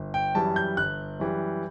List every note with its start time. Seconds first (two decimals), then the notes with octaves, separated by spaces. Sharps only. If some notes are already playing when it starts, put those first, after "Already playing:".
Already playing: G1
0.14 G5
0.35 F#2 E3 G3 A5
0.56 G6
0.77 G1 F#6
1.20 F#2 E3 G3